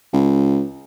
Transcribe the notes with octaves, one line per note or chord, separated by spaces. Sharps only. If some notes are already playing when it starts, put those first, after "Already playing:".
C#2